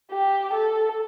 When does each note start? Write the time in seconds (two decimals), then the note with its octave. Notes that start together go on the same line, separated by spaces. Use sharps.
0.11 G4
0.54 A4